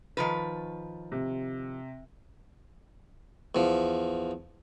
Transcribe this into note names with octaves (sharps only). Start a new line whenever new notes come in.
D#3 F3 B4
C3
E2 F3